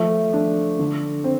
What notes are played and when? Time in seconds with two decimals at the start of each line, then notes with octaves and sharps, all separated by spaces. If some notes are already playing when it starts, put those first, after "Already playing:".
Already playing: F3 A3 A4
0.33 D4
0.79 D3
1.24 C4